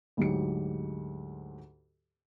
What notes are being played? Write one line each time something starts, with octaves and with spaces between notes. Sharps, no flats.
D2 G#2 F#3 G4 C#7